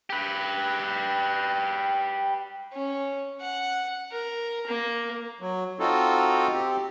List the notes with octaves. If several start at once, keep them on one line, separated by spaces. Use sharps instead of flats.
G4 B4
C#4
F#5
A#4
A#3
F#3
C4 D#4 F4 F#4 A4
C4 G4